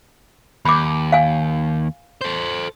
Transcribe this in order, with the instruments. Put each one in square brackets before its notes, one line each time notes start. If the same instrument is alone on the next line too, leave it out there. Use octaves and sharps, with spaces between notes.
[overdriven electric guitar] D#2 [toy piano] B5 D6
[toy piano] F5 G#5
[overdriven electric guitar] A4 C5